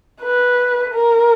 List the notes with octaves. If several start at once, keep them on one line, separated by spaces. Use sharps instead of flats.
B4
A#4